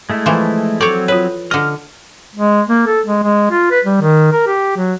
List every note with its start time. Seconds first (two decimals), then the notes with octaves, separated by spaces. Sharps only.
0.10 G#3 A3 E4
0.26 E3 F3
0.81 F#3 C4 A4 C#5 D5
1.08 F4 B4 C#5
1.51 D3 D#5 F6
2.35 G#3
2.69 A#3
2.87 A4
3.06 G#3
3.23 G#3
3.51 F4
3.71 B4
3.85 G3
4.01 D#3
4.32 A#4
4.47 G4
4.77 F#3